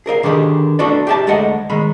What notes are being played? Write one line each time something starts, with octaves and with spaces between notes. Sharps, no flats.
G#4 A#4 D#5 F5
D3 D#3 G4 G#4 B4
D4 F#4 A4 B4 D5
G4 G#4 E5 G#5 A5
D2 G#3 A4 D#5 F#5
D#3 G#3 B5